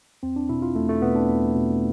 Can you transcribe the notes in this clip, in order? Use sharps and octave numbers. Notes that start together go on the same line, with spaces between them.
E2 C4
D4
B2 E4
F4
E2 A3
A3
B2 B3
D4
E2
B2